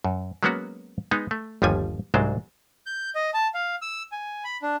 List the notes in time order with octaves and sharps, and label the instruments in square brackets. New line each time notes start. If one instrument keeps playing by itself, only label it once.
[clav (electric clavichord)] F#2
F#3 G#3 A#3 B3 C#4 F#4
G#3 B3 D#4
A3
G1 D#2 F3 G3 G#5
C2 G#2 F#3 G#3 D4 C5
[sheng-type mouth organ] G6
D#5
A5
F5
E6
G#5
B5
D4